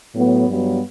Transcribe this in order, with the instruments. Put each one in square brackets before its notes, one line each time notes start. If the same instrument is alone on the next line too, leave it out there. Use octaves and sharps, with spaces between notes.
[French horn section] A2 F#3 B3
G2 F#3 B3